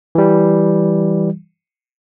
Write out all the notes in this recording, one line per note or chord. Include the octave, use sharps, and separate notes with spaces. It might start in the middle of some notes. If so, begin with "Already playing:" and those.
E3 G3